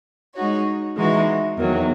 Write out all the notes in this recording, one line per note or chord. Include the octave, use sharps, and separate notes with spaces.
G#3 D#4 F#4 C#5
E3 G#3 D#4 F#4
E2 D#3 F#3